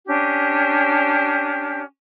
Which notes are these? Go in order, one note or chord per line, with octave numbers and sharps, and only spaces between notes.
C#4 D4 G4